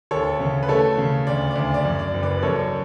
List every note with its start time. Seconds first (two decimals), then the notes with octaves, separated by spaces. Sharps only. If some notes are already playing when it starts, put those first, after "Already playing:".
0.11 D2 A4 C#5
0.40 C#3
0.63 B4
0.69 A3 A4 C#5
0.98 C#3
1.27 D2 D5
1.51 D2 D5
1.74 D5
1.85 F#2
1.99 D5
2.14 F#1
2.22 B4 D5
2.43 F#2 A4 C#5